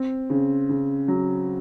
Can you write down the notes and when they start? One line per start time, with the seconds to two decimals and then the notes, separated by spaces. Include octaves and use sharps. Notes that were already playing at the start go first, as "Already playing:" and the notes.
Already playing: C4
0.30 C#3
0.69 C#3
1.08 F#3